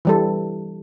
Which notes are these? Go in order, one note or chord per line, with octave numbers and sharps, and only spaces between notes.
E3 G3 A4